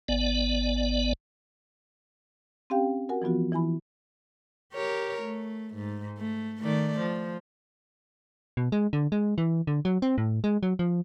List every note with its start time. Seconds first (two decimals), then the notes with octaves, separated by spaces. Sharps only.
0.08 G#1 B3 D5
2.70 C4 C#4 G4 F5 G5
3.09 F#4 A#4 F#5 G#5
3.22 E3 F3 B3 F4 F#4
3.52 E3 E4 G#5 B5
4.73 G4 A#4 C#5
5.22 A3
5.75 G#2
6.18 A3
6.61 D#3 A3 D5
7.00 F3
8.57 B2
8.72 G#3
8.93 D3
9.12 G#3
9.38 E3
9.67 D3
9.85 F#3
10.02 C4
10.18 A2
10.44 G#3
10.63 F#3
10.79 F3